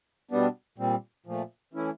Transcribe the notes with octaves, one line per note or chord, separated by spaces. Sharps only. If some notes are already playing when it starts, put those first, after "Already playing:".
B2 G3 B3 D4
A#2 G3 C4
A#2 F3 A3
E3 A3 C#4 E4